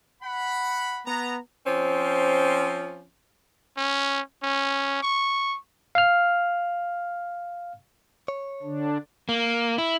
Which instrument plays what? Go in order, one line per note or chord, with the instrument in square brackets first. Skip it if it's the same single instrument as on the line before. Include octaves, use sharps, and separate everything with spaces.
[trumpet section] F#5 B5
[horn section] B3 A#5
[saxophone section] F3 C4 C#4
[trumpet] C#4
C#4
C#6
[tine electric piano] F5 F6
[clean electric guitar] C#5
[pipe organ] D3 D4
[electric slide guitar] A#3
E4